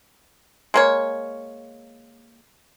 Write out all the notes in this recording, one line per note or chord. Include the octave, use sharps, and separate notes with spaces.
G#3 A#3 C#5